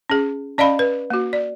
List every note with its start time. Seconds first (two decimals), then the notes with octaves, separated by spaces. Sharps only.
0.10 C#4 G#4
0.58 C#4 D5 D#5 F5 B5
0.79 B4
1.10 A#3 F#4
1.33 D5